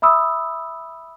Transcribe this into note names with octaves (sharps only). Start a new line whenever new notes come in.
E5 B5 D#6 E6